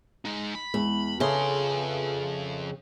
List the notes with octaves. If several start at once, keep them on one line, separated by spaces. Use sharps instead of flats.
G#3 D#4
B5
E2 G#3 E4
F2 C#3 G#4 A4 B4 E5 C6